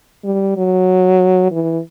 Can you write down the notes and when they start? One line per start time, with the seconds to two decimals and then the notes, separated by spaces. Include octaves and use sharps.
0.24 G3
0.57 F#3
1.52 E3